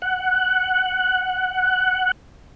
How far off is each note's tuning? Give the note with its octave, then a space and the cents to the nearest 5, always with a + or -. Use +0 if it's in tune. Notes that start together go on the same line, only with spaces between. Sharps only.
F#5 +5